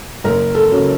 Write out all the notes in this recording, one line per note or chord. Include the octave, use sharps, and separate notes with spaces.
F#1 A#4
A4
F#2 C#3